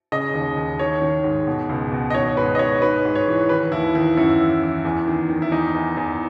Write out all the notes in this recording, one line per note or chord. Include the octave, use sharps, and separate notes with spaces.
C#3 D#5
D#2
D#2
D#3 C#5
D#3
G#2
B2
C#2
B2
D#5
D#3 C#5
G#2 B4
D#5
G#2 C#5
G#2 B4
G#2
C#5
E3
D#3 B4
D#2 E4
D#3 E4
F#2 E4
E3
E3
E2
D#3
D#3
E4
E2 D#4
E2
E2